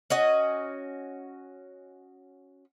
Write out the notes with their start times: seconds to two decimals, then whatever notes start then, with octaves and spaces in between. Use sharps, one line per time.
0.10 C#4 F#4 D#5